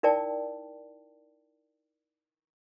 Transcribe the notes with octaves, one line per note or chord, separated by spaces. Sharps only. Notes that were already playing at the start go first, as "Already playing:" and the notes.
D#4 E4 A#4 D5 G5 A5